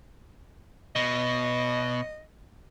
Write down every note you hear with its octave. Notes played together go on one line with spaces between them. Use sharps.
B2 D#5